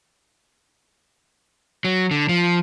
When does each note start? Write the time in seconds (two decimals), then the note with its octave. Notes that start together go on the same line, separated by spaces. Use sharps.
1.85 F#3
2.11 D3
2.29 F3